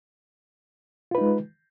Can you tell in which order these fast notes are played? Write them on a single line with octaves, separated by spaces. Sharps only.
F4 B4 D#4 G#3